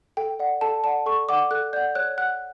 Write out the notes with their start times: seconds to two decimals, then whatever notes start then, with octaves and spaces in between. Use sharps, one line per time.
0.17 A4 G5
0.39 D5 F#5
0.61 A4 A5
0.84 D5 F#5 A5
1.06 A4 C#6
1.28 D5 F#5 D6
1.51 A4 F#6
1.73 D5 F#5 G6
1.95 C#5 F#6
2.18 F#5 F#6